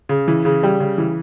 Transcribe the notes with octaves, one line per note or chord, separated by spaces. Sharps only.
C#3
E3
C#3
G3
C#3
E3